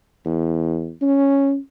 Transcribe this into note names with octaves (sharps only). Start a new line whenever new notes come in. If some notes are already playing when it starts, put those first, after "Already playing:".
E2
C#4